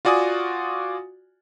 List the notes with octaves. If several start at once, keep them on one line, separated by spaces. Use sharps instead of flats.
F4 F#4 D5 G#5 D#6